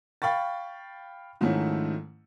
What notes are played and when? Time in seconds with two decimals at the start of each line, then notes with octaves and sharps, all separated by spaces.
0.22 F5 G5 B5 C#6 A6
1.41 G#2 D#3 F3 A3 C#4 E4